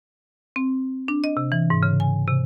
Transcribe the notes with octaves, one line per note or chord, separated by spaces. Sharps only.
C4
D4
D#5
C3
E3
G#2
C#3
G#5
C3